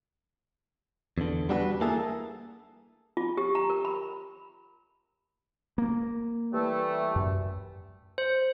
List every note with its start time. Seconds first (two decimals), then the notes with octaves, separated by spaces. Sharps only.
1.18 E2 D3
1.49 G3 D4 F#4 G#4 B4
1.81 A#3 E4 G#4 A4
3.17 F4
3.37 G4
3.55 A#5
3.70 A#4
3.85 B5
5.78 A#3
6.53 E3 G3 A3
7.16 F#2
8.18 C5